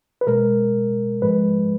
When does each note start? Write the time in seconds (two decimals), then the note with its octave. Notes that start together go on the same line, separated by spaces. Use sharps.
0.21 B4
0.27 B2 G#3 A#4
1.22 G#2 F3 G#3 B4